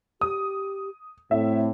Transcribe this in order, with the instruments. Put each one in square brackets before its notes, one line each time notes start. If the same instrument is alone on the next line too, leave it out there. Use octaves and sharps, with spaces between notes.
[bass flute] G4 [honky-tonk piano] D#6
[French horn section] A2 [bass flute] C4 [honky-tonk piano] E5